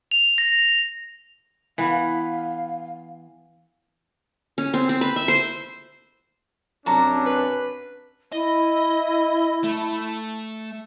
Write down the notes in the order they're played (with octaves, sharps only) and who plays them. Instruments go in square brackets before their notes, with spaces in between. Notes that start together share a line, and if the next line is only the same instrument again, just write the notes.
[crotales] F7
A#6
[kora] E3 B3 B4 [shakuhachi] F5
[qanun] C#4
C4
C4
B4
E5
C5
[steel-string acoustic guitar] F#2 C3 [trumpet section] C#4 D4 [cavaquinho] F#4 A5 A#5
[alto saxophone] B4
[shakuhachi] E4 [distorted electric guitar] D#5
[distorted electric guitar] A3